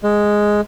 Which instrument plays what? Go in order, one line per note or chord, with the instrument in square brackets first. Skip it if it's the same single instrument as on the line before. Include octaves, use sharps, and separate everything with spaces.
[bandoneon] G#3